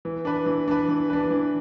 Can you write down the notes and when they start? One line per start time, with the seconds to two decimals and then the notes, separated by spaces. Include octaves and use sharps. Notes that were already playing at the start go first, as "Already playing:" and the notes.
0.05 E3
0.25 D4 B4
0.46 E3
0.68 D4 B4
0.88 E3
1.10 D4 B4
1.31 E3